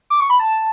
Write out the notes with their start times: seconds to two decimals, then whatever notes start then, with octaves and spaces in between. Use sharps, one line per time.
0.10 D6
0.20 C#6
0.30 B5
0.39 A5